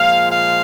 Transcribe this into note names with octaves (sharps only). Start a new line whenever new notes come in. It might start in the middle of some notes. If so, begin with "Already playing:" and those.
Already playing: A#2 F3 G#3 F5
F5